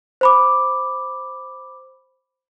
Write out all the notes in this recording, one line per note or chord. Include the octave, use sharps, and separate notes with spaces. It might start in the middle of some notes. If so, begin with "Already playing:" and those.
C5 B5 D6